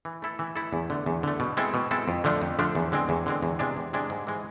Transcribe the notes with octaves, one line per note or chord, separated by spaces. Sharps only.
E3
A3 E4 A4
E3
A3 E4 A4
E2
D3 A3
E2
D3 A3
B2
G#3 C4 E4 A4
B2
G#3 C4 E4 A4
F2
D3 F3 A3 D4
F2
D3 F3 A3 D4
E2
D3 G#3 C4
E2
D3 G#3 C4
E2
C3 G#3 D4
E2
C3 G#3 D4
G#2
E3 G#3